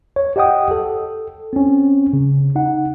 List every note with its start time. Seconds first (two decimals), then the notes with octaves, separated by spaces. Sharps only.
0.16 C#5
0.36 G4 D#5 F#5 G5 D#6
0.71 A4
1.53 C4 C#4
2.13 C#3
2.56 D#4 F#5